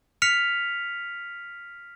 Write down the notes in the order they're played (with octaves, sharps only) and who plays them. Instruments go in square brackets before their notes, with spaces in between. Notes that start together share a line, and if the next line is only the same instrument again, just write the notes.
[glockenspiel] F6 B6 C#7 F7